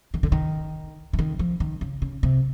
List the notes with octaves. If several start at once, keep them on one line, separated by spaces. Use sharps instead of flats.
D#3
D3
D#3
E3
D#3
F3
D#3
C#3
C#3
C3